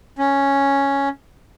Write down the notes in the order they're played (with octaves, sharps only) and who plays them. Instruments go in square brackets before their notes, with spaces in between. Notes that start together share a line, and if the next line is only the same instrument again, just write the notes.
[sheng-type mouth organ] C#4